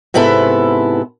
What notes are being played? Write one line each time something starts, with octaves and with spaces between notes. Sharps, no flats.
G#2 C3 B3 E4 A4